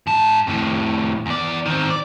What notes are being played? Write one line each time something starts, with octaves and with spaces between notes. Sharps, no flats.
G#2 A5
F2 A2
E2 D5
D#3 C4
D5